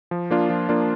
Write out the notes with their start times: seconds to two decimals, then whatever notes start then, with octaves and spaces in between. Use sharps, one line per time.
0.11 F3
0.31 A#3 D4 F4
0.50 F3
0.69 A#3 D4 F4